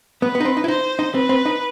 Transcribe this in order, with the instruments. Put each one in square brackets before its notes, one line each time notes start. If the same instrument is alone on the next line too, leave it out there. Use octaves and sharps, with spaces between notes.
[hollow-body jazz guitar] B3 [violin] B4
[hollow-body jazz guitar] B3
D#4
C4
D#4
E4
[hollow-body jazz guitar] D#4 [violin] C5
[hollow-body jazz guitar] D#4
[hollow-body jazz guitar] C4 [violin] B4
[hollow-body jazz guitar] C4
D#4